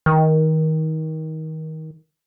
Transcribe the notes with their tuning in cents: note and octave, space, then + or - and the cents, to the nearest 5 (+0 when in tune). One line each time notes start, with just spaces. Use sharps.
D#3 +25